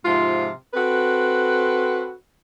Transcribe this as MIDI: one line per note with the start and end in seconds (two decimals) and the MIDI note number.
0.05 0.49 44
0.05 0.49 48
0.05 0.49 53
0.05 0.49 65
0.74 2.11 60
0.74 2.11 66
0.74 2.11 69
0.74 2.11 71